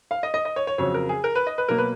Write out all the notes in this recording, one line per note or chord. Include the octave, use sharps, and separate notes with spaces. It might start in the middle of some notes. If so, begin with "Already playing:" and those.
F5
D#5
D#5
D#5
C#5
C#5
F2 C#3 F#3 C#5
A#4
G#4
A#4
B4
D#5
B4
B2 F#3 A#3 A#4
B4